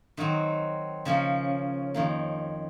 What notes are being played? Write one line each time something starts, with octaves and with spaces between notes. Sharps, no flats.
D#3 F#3 C4 D#4
C#3 F3 A#3 C#4
F2 D#3 A#3